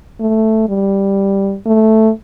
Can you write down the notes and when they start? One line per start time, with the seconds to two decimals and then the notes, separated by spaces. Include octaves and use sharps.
0.20 A3
0.69 G3
1.66 A3